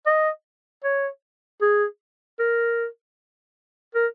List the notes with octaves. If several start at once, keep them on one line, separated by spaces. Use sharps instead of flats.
D#5
C#5
G#4
A#4
A#4